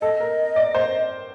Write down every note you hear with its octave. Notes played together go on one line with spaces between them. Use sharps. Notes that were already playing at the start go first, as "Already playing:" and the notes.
A4 D#5
A#4
D5
C5